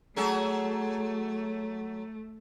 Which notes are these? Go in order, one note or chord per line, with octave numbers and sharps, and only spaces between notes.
F#3 A3 G#4 A4